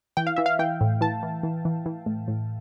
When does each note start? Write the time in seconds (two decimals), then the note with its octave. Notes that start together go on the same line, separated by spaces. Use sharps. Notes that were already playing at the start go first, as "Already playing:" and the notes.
0.17 E3 G5
0.27 F5
0.36 E3 E5
0.46 F5
0.59 E3 G5
0.81 A2
1.01 E3 A5
1.23 E3
1.43 E3
1.65 E3
1.86 E3
2.06 A2
2.28 A2